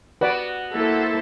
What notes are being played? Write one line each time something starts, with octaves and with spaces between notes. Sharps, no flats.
B3 F#4 B4 D5
A#3 E4 A4 C5